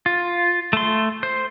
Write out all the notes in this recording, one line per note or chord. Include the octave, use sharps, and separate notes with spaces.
F4
A3 C6
C5